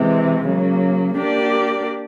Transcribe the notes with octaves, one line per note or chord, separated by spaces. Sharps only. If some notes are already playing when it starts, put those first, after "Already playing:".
Already playing: C3 E3 G#3 C4
C#3 F#3 A#3
A#3 D4 G4 A#4 D5